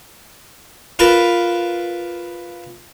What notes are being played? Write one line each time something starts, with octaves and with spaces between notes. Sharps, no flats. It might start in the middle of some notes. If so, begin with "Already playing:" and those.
F4 A#4 B4 A5 A#5